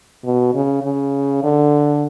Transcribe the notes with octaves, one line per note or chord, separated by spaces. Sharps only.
B2
C#3
C#3
D3